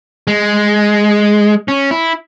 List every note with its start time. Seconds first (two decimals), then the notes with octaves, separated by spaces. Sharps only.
0.27 G#3
1.68 C#4
1.91 E4